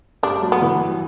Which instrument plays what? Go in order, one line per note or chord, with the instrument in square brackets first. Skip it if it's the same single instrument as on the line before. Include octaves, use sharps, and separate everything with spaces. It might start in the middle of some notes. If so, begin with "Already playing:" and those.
[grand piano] G2 G3 [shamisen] D4
[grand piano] F#3
[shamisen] B3
[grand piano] E3